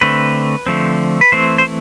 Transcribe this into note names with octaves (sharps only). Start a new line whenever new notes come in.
D3 A3 C4 B4
D3 F3 A3 C4
B4
E3 A3 C4 C5
C5